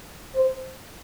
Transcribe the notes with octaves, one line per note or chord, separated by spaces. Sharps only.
C5